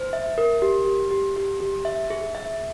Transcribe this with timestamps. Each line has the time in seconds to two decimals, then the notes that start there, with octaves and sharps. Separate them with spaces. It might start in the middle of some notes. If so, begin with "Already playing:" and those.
Already playing: C5
0.13 E5
0.38 A#4
0.62 G4
0.86 G4
1.11 G4
1.36 G4
1.61 G4
1.85 E5
2.10 G#4
2.35 E5